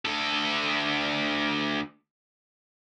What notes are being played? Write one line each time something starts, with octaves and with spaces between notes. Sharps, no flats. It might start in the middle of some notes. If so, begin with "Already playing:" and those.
D2 A4